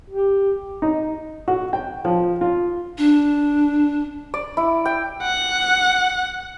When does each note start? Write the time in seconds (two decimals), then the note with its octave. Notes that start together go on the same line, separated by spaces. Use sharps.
0.10 G4
0.82 D#4
1.48 F#4
1.73 G5
2.05 F3
2.41 F4
2.98 D4
4.34 D5
4.57 E4
4.85 G5
5.22 F#5